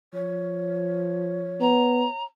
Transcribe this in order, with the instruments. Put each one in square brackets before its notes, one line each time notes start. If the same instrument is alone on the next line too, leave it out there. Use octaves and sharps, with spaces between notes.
[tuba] F3 [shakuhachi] C#5
[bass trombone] B3 [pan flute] A#5